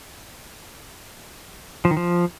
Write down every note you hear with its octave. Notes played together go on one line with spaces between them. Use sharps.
F3
D#3
F3